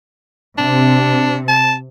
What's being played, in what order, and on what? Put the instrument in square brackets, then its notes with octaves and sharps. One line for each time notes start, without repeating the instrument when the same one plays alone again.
[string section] C3 [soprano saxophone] D4
[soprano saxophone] A5